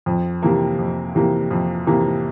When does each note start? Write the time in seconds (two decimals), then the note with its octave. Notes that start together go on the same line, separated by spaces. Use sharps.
0.06 F2
0.42 C3 E3 A#3
0.79 F2
1.15 C3 E3 A#3
1.51 F2
1.87 C3 E3 A#3